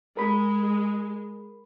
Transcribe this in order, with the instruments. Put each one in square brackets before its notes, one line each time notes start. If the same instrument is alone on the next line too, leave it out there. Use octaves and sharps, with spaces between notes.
[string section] G#3 [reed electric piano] A#4 B5